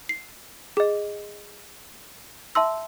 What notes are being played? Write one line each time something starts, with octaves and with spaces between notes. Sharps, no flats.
C7
G#4 D#5
E5 A5 C6 E6